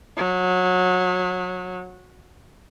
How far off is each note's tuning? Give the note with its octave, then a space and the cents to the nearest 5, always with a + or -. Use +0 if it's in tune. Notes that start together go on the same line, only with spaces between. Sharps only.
F#3 -25